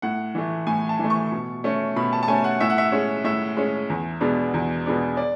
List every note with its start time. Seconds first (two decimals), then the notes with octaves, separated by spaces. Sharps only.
0.02 A2 F#5
0.35 E3 A3
0.67 A2 G#5
0.89 A5
0.99 E3 A3
1.10 C#6
1.32 B2
1.64 A3 C#4
1.96 B2 B5
2.13 A5
2.23 A5
2.28 A3 C#4 G#5
2.44 F#5
2.60 A2 E5
2.70 F#5
2.78 E5
2.92 G#3 C#4
3.24 A2 E5
3.57 G#3 C#4
3.90 E2
4.21 B2 G#3 B3 D4
4.54 E2
4.86 B2 G#3 B3 D4
5.17 D5